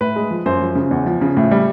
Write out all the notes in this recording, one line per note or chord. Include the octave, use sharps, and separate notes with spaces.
A2 B4
G#3
F3
F#2 C5
F3
C#3
E2
F3
C#3
A2
G3